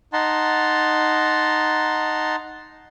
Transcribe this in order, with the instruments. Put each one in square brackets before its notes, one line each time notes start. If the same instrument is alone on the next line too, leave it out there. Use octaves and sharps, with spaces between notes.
[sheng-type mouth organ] D#4 F#5 A5 A#5 C6